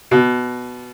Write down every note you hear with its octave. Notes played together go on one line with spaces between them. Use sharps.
B2